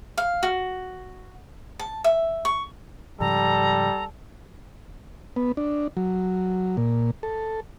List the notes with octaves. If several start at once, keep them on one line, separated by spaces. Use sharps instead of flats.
F5
F#4
A5
E5
C#6
G#2 C#3 F3 G3 A4 A#5
B3
D4
F#3
A#2
A4